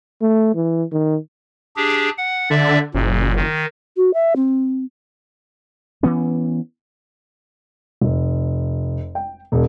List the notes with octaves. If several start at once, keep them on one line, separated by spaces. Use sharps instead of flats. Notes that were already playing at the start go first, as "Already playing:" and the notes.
A3
E3
D#3
D4 G4 G#4
F#5
D3 D5 E5
F#1 A#2
D#3
F#4
E5
C4
E3 B3 C#4
F1
G5
E1